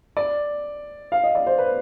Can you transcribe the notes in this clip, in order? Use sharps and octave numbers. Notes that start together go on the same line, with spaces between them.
D5
F5
D#5
D5
C5
B4